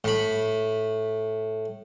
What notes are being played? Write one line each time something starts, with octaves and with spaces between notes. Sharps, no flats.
A2 B5